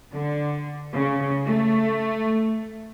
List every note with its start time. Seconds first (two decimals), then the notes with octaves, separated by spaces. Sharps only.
0.12 D3
0.92 C#3
1.44 A3